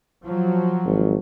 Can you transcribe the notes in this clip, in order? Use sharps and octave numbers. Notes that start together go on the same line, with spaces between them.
F3 F#3
G#1